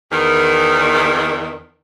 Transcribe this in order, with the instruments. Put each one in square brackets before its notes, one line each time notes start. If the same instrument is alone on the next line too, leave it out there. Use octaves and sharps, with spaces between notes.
[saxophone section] E2 D#3